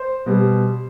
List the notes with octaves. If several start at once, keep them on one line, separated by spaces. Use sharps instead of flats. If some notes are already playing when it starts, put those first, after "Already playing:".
Already playing: C5
B2 G3